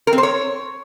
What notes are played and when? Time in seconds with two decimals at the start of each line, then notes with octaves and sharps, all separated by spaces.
0.07 A#4
0.13 C4
0.18 C5
0.23 C#5